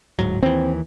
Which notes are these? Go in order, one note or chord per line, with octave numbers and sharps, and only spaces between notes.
D1 G#2 F#3
D#2 E3 C4